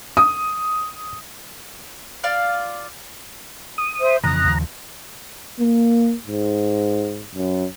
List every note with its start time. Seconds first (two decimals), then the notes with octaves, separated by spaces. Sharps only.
0.17 D#6
2.24 F4 D5 F5
3.78 D#6
4.01 C5 E5
4.24 F2 C#3 E3 A#5 D#6 F#6
4.44 D#2 C#3 F3
5.60 A#3
6.27 G#2
7.35 F#2